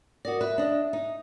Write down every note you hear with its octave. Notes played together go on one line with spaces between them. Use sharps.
F#4 A#4 D5 D#6
B4 E5
D4 D#5
D#4